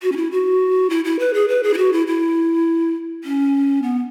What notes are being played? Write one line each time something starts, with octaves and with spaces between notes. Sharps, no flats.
F#4
C#4
E4
F#4
E4
E4
B4
G#4
B4
G#4
E4
F#4
E4
E4
C#4
B3